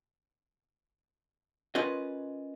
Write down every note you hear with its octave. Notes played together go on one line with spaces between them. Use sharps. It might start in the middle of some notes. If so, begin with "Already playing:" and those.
C#4 F4 A#4 B4 D#5